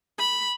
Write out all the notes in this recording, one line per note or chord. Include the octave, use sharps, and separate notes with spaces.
B5